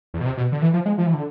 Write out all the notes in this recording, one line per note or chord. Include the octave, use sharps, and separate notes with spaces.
E2
B2
C3
B2
D3
E3
F3
G#3
F3
E3
D3